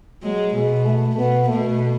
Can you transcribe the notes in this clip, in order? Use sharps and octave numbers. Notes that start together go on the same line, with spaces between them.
F#3 G#3
B2 G#3
A3
B2 B3
B2 A3